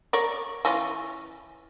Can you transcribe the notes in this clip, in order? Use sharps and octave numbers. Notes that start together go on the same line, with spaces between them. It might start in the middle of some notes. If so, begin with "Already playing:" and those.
A#4 C#5 D5
E3 C#4 F4